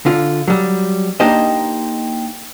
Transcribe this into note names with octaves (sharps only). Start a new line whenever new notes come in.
D3 F4
F#3 G3
A#3 D4 D#4 G4 C5 D#5